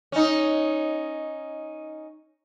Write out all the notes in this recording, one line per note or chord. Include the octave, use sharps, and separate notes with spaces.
C#4 D#4